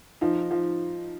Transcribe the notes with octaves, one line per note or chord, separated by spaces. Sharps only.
F3 D#4
F3